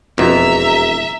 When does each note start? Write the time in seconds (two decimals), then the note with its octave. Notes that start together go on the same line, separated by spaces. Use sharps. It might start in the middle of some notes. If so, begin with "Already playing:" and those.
0.18 E1 F2 B2 E5 A#5